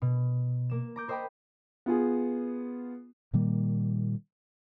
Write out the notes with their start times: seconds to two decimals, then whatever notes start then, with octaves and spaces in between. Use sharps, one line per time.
0.02 B2
0.70 A#3 E7
0.96 A#5 D6 G6
1.08 A#4 C5 D#5 G5 A#5 B5
1.86 B3 F4 G#4
3.33 A#2 D#3 G3 A#3